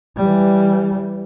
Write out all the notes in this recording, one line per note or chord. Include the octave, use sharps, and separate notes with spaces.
E3 G3